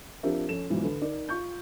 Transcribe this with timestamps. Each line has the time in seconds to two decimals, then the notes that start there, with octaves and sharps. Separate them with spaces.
0.23 F3 C4 D4 G4 A#4 E5
0.48 F2 C#4 A4 E7
0.70 B1 G#2 B2 E3 F3
0.83 D3 A4 B4
1.01 D#4 A#4 D5
1.29 F4 C#6 G6